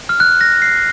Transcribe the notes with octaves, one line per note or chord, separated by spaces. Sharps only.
F6
F#6
A#6
C7